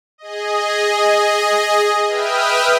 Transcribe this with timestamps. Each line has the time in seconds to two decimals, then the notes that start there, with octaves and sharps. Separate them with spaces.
0.18 G#4 D#5
2.08 B4 E5 G5 D#6 F6